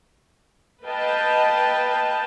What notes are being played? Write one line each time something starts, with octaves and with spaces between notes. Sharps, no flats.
B4 D#5 F5 G5 A5